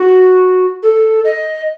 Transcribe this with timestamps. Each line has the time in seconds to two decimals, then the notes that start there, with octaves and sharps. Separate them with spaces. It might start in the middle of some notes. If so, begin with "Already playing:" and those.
Already playing: F#4
0.83 A4
1.25 D#5